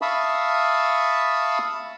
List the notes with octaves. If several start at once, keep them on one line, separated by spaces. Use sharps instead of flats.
E5 F5 A5 B5 C#6 D#6